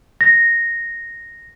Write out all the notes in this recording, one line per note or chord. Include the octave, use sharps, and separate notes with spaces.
A#6